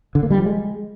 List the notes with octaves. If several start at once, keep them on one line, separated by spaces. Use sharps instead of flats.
D3
A#3
G3
F3
G#3